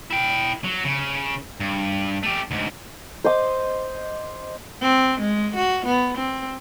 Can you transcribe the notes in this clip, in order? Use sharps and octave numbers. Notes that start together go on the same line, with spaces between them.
E4 G5
F#3
C#3
G2
A3 G4
D2 G#2
C5 D#5 D6
C4
G#3
F#4
B3
C4